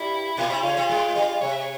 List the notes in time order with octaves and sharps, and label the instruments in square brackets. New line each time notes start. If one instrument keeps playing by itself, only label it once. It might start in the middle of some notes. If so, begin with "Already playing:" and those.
Already playing: [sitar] G2 G3 [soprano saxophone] E4
[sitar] A#2 A#3 [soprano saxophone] F4
[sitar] C3 C4 [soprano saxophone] E4
[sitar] C#3 C#4 [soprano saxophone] F4
[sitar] C3 C4
G#2 G#3
G2 G3
[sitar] C3 [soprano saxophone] C#5
[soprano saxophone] E5
C#5